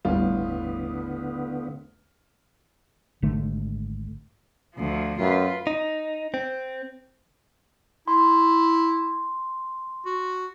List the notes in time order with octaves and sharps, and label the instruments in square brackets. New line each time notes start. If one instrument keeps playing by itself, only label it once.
[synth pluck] G1 D#2 G3 [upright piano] A2 F4 [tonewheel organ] D3 B3
[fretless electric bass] G#1 D3 A3
[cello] D2 F3
[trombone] F#2 [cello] F4 B4
[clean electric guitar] D#4
C4
[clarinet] E4 [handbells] C6
[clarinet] F#4